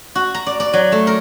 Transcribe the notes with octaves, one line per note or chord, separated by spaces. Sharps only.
F#4
A#5
D5
D5
F#3
A3
A#4